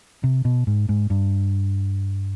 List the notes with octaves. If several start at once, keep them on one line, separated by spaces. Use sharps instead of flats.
C3
B2
G#2
G#2
G2